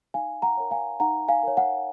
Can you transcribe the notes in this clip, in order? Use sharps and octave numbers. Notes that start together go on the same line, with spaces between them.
D#4 F5 G#5
F#5 A#5
A#4 C#5
F5 G#5
D#4 F#5 A#5
F5 G#5
A#4 C#5
F#5